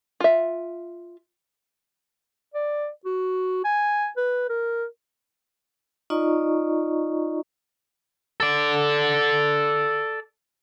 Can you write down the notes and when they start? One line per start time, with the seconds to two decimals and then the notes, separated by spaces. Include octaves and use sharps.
0.20 F4 E5
2.54 D5
3.06 F#4
3.65 G#5
4.17 B4
4.49 A#4
6.10 D#4 F4 D5 D#5 A#5 C#6
8.40 A4 D5